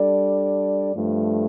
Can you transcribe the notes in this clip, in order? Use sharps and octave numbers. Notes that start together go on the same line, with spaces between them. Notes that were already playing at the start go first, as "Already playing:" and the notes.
Already playing: G3 D4 A4 D5
G2 F3 A3